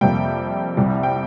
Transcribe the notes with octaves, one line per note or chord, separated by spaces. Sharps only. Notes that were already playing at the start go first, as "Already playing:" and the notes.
F2 C3 G3 A#3 G5
C2 C3 G3
G5